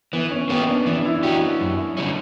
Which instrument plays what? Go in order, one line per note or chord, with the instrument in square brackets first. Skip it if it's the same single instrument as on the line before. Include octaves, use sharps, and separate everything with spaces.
[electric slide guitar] E3 [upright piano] B3
[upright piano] C#4
[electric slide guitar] A#3 C#4 G4 [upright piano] B3
[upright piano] D4
[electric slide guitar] E3 [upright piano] D4
[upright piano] E4
[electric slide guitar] A#3 C#4 G4 [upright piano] F#4
[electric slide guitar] F#2
D3 G3 C#4